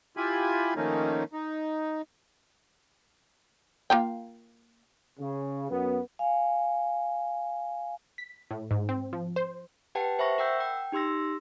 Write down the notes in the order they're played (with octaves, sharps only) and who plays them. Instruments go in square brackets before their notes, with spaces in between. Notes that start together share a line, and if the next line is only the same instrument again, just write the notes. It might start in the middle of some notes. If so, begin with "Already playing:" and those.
[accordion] E4 F4 G4 G#5 B5
D#3 F3 A3 A#3 C#4 D#4
D#4
[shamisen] A#3 F4 G5
[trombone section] C#3
F#2 B3
[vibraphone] F5 G#5
[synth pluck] B6
A2
G#2
C4
F3
C5
[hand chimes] G4 B4 F#5 G5 A5
C5 E5 B5 C#6 A#6
A#4 F#5 G5 E6 G6
G5
D#4 G4 C6 E6 A#6